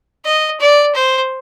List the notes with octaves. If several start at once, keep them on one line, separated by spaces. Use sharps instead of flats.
D#5
D5
C5